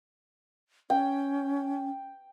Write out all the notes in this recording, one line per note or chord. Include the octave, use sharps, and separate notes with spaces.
C#4 G5